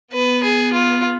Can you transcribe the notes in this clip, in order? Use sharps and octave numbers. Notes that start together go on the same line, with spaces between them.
B3 B4
G#4
F4